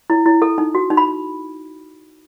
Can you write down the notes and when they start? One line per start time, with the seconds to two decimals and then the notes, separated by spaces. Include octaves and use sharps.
0.10 E4
0.26 E4
0.42 A4
0.58 D#4
0.75 F#4
0.90 D#4
0.97 B5